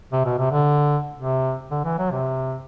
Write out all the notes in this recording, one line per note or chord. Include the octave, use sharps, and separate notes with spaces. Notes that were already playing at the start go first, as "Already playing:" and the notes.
C3
B2
C3
D3
C3
D3
E3
F#3
C3